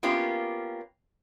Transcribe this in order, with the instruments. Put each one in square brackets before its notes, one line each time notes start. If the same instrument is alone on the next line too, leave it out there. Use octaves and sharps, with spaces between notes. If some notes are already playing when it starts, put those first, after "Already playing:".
[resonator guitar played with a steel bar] A#3 B3 C#4 F4 G4